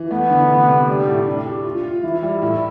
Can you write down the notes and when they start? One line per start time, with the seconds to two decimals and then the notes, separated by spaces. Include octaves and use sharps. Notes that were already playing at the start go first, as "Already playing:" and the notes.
Already playing: E3
0.10 A3 B3
0.29 D3
0.49 C3
0.68 C3
0.87 G3 A3
1.07 A2
1.26 D4
1.45 G4
1.65 F4
1.83 F4
2.03 E3 E4
2.22 G3
2.42 A2